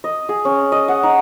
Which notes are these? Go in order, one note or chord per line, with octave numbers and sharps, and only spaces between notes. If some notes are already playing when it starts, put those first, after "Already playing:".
D#5
G#4
C#4
D#5
F#5
D#4